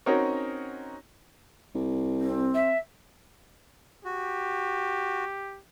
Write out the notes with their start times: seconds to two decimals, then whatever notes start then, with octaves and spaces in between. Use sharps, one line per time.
0.06 C4 C#4 D#4 F#4 A#4 C#5
1.75 C2
2.20 C4
2.54 E5
4.05 F#4 G4